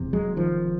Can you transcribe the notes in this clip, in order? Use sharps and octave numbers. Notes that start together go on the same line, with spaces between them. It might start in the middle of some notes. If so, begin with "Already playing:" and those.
Already playing: E1 E2 C3
F#3 G#3
D#3 F3